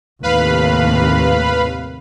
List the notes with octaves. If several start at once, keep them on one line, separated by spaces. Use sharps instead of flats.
D#2 A2 C3 B4 F5 B5